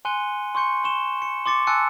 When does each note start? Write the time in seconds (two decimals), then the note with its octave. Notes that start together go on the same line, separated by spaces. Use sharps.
0.05 G#5 C6 F#6 C#7 D#7 G7
0.55 C6 C#6 G6 C#7
0.84 C6 C#6 C#7 E7 G7
1.22 C#7
1.46 C6 D6 A6 C#7
1.67 G#5 A5 E6 F#6 A6 C#7